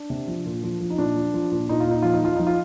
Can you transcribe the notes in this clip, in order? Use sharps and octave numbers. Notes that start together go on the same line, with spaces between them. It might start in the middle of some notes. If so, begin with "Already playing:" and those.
Already playing: D4
C3
F3
A#2
F3
F3
D#4
A#2 D4
F3
F3
A#2
A#2 D#4
F4
A#2 D#4
F3 F4
D#4
F3 F4
F3 D#4
F4